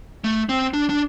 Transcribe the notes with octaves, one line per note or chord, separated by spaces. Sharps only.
A3
C4
D4
D4